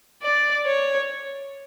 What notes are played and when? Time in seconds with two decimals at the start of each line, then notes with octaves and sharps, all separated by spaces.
0.22 D5
0.66 C#5